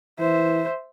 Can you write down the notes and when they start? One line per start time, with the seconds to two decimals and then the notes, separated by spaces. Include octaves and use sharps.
0.19 E3 C5 E5